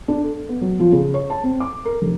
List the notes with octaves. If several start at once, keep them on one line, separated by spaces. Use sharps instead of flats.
D4
A4
B3
F#3
F3
C#3
C#5
A5
C4
D6
A#4
F1